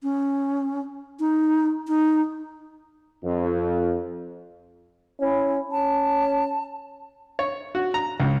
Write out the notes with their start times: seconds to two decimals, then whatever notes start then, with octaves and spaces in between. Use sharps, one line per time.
0.03 C#4
1.20 D#4
1.88 D#4
3.24 F2
5.20 C#4 E4
5.71 C#4 A5
7.39 C#5
7.75 F#4
7.94 A#5
8.20 C#2